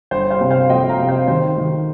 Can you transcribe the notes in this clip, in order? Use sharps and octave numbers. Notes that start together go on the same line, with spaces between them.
G1 C5
C5 F5
C3
C5 F5
F2 D#5 G5
F5 A#5
C3
C5 F5
D#3 C5
D#3